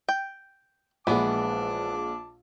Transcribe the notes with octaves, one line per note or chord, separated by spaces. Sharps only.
G5
A#1 E3 G#3 B3 D4 A5 D6